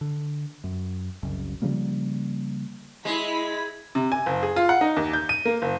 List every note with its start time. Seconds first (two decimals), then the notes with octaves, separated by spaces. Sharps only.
0.01 D3
0.64 F#2
1.23 F#1 C2 F#2 C#3
1.62 C#3 F3 G3 A#3
3.05 G#3 E4 B5 B6
3.95 C3
4.12 G#5
4.26 F#1
4.43 G#4
4.56 F4
4.69 F#5
4.81 D#4
4.96 D#2
5.13 G6
5.29 D#7
5.45 A#3
5.62 F#1